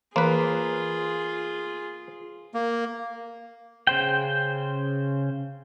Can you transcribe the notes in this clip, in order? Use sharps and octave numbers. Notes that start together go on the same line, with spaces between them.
E3 A#3 F4 G#4 B4
A#3
C#3 C5 G5